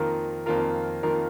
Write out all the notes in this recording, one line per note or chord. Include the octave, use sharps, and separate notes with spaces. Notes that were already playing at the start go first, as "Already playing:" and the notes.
Already playing: F2 D#3 A#3 F4 A#4
F2 D#3 A#3 F4 A#4
F2 D#3 A#3 F4 A#4